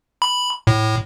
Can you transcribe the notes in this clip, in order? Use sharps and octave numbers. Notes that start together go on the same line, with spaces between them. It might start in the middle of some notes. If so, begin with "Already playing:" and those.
B5
A2